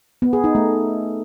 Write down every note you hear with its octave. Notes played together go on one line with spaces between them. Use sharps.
B3
G#4
D#4
A3